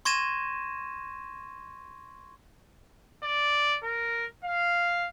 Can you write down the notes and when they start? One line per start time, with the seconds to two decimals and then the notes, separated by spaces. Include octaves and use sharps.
0.05 C6 C#6 G#6 A#6 D#7 E7
3.23 D5
3.84 A#4
4.45 F5